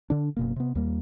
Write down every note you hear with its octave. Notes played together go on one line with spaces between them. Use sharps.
D3 D4
F#1 B2 A#3
C3 B3
D#2 G3 A#3